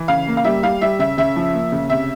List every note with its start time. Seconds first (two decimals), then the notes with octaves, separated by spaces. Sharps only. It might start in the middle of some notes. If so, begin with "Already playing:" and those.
Already playing: E3
0.08 C#3 F5
0.27 A#3
0.37 F5
0.44 G3 E5
0.63 G3 F5
0.81 G3 E5
0.99 C#3 E5
1.17 C#3 E5
1.36 F3
1.54 A#3
1.72 C#3
1.90 C3 E5